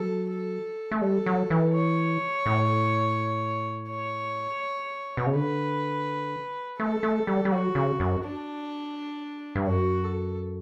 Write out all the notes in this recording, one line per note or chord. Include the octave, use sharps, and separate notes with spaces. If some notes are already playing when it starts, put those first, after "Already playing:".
Already playing: F#3 A4
A4
A3
G3 A4
F#3
E3
C#5
A2
C#5
B2
C#3
D3 B4
A3 A4
A3
G3
G3
F#3 F#4
C#3
F#2
D4
G2
F#2 F#4
A4